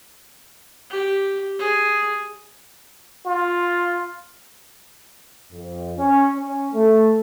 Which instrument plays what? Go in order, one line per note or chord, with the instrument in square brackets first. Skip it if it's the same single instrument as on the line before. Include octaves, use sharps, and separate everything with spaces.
[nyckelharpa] G4
G#4
[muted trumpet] F4
[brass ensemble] F2
C#4
C#4
A3